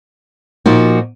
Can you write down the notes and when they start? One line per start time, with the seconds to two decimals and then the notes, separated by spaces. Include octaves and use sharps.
0.66 A#2 F3 A#3 D#4 F#4